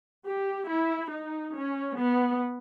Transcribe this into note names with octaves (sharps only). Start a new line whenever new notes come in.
G4
E4
D#4
C#4
B3